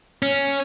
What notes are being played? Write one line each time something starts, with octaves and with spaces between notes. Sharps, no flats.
C#4